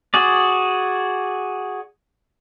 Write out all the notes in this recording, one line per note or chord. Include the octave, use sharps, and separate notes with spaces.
F#4 G#4 D5